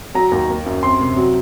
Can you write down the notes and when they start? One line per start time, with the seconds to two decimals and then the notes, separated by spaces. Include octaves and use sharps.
0.15 F#3 A#5
0.32 D#2
0.49 A#3
0.66 F#2
0.83 C4 C6
1.00 C3
1.16 F#3